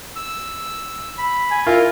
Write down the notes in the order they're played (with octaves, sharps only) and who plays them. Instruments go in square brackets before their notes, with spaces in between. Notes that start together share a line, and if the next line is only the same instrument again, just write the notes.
[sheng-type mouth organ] E6
B5
[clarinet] G#5
[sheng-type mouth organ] E4 [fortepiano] F4 [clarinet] A#4